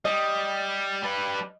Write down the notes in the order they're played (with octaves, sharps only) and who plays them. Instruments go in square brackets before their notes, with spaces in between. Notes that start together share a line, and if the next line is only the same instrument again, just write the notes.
[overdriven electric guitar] G3 [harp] D#5
[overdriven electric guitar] G3 B4